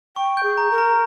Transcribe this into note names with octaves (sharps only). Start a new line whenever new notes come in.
G5 C#6
G6
G#4
A#5
A#4
A#5